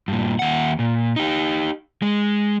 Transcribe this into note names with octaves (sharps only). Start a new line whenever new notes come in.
G2 A#2
D#2 F#5
A#2
D#4 G4
G#3